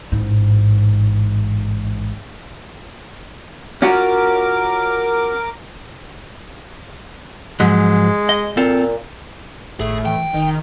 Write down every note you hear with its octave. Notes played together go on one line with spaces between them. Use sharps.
A1 G#2
C#4 F4 F#4 A#4 D6
G#2 F3 F#3 G#3
D#5
A#2 C4 F4 A4
G#1 A2 A3 G#4
E3 G5
F1 D#3 D#4